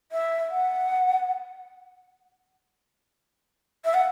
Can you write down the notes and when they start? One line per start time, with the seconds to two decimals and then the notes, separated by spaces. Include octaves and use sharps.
0.12 E5
0.50 F#5
3.85 E5
3.94 F#5